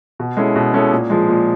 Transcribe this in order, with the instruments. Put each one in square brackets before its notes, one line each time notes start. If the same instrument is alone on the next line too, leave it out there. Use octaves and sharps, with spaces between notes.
[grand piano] B2
G#3 C#4 E4 A4
B2
G#3 C#4 E4 A4
A#2
F3 G#3
A#2